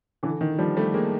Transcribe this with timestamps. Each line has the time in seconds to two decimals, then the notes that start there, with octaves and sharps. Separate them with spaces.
0.23 D3 E3
0.41 D#3
0.58 F3 G3
0.77 G3 A3
0.94 G#3 A#3